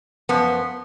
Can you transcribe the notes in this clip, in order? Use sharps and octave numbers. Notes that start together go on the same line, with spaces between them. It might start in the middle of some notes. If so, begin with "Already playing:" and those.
F#2 F3 B3